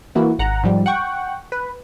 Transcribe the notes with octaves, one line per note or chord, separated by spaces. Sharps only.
E3 A#3 E4 F#4
G#1 F#5 A#5
G#2 F3 G3
F#5 G5 C#6
B4